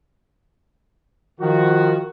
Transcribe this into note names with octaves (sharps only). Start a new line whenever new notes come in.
D#3 F3 F#4